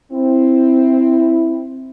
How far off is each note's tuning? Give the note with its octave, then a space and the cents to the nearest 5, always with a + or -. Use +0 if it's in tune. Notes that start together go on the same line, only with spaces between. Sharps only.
C4 +0 E4 +0